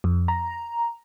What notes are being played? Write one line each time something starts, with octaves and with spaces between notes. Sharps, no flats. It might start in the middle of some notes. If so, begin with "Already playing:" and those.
F2
A#5